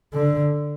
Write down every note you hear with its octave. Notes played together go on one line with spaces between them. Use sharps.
D3